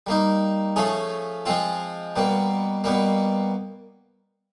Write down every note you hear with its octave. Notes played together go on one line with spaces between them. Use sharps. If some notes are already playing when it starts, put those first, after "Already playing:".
G3 A#3 D#4
F3 A3 C#4 F4 G#4
F3 G#3 C4 F4
B2 G3 A#3
B2 G3 A#3